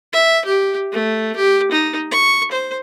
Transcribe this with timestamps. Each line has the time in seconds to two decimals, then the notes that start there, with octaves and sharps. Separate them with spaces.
0.13 E5
0.45 G4
0.92 A3
1.36 G4
1.72 D#4
2.11 C#6
2.52 C5